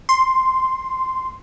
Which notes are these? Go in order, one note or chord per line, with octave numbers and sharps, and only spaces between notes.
C6